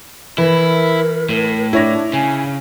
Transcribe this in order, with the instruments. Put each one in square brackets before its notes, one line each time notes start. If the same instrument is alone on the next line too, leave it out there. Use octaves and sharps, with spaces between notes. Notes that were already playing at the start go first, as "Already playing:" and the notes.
[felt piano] E3 [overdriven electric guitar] E4 [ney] A#4
[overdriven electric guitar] A2
[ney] D4 [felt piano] E4 C#5 A#6
[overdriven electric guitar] C#3 [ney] G#5